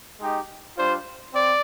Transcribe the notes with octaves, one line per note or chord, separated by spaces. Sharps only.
G#3 D#4 G4
G3 D4 F4 C5
C4 D5